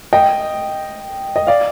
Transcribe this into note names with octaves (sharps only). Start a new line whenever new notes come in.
D#5 G5
D#5
D5 F5